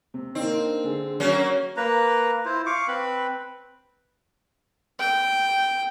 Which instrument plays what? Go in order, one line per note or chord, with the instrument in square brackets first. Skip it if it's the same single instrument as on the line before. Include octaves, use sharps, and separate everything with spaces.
[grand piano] C3
[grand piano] A#3 D4 D#4 [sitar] C4
[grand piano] D3 G#4
[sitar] F#3 A#3 C#4
[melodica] A#3 B4 A#5
E4 F4 C5
F5 C#6 D6
C4 B4 B5
[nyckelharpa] G5